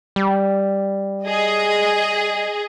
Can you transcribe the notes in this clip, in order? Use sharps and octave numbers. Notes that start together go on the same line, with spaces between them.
G3
G#4 D#5